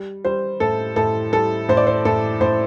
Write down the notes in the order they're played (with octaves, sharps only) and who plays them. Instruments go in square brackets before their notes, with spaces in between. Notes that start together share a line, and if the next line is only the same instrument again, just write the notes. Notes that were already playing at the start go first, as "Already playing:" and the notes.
Already playing: [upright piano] G3
G3 C5
A2 A4
A2 A4
G3 A4
A2 C5
D5
C5
A2 A4
A2 C5